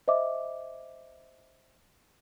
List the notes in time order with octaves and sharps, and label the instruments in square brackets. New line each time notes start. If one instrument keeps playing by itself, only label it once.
[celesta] C5 D#5 E5 D6